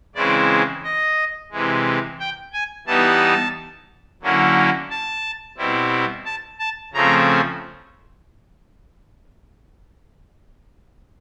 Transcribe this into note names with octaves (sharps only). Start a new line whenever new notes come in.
C#3 E3 G#3 C4 E4 D5
D#5
C3 E3 G#3
G5
G#5
E3 G3 B3 D#4 A5
D3 F#3 A#3 C#4 E4
A5
B2 G3 C4 E4
A5
A5
C#3 F3 A3 C4 A#5